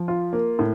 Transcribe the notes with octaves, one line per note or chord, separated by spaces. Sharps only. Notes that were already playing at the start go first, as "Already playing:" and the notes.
Already playing: F3
F4
A#3
A2